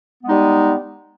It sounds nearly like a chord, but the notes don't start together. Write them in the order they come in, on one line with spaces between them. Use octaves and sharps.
B3 G#3 D#4 G3